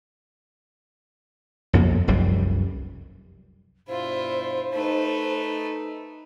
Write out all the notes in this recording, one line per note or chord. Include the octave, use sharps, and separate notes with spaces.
B1 F2 A#3
F1 C2 F#2 G3
G2 B2 E4 F4 C5
A3 D#4 B4